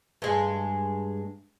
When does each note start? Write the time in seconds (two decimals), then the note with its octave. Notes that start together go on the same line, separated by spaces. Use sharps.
0.22 G2 G#3